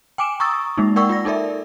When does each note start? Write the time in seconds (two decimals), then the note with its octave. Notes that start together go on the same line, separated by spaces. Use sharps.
0.18 G5 G#5 D6 D7 E7
0.40 A#5 C#6 D#6 E6 A6
0.78 G#3 A#3 D#4
0.96 A#4 D5 F#5 G5 C#6 E6
1.09 F4 D5 A#6
1.25 D#4 A4 A#4 D5 E5